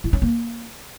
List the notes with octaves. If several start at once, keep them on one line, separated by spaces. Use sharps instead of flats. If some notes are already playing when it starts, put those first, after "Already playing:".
E4
C#4
A#3